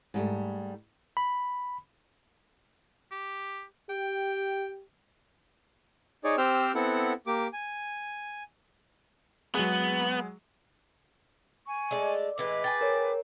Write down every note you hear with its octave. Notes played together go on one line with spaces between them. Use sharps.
G#2 G3 A3
B5
G4
G4 G5
D#4 G#4 C#5 D5
C4 G4 C5 G5 E6 F6
B3 C4 E4 A4 F#5
A#3 G4 D6
G#5
F#3 G#3 B3 G#4
G#5 C#6
G#3 A3 D5
A2 E3 G#3 B4 D6
G#4 G5 G#5 A6
A#4 C#5